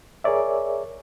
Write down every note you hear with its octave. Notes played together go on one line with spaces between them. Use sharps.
G#4 A#4 C#5 D5 E5